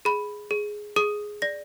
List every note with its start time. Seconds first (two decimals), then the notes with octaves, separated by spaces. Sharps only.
0.05 G#4 B5
0.51 G#4
0.96 G#4 D#6
1.42 D5 A#6